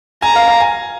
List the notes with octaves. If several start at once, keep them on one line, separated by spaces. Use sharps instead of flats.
G#5 A#5
F5
F5
G#5